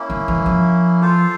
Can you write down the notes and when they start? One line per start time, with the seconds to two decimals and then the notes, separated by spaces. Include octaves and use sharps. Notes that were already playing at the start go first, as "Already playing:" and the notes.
Already playing: A#3 C#4 E4
0.10 D#3
0.28 E3
0.46 F3
1.01 F4 A4 C5 F5